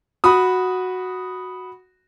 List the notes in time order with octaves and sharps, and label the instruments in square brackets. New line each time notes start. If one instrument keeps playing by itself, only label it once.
[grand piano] F#4 B5 D#6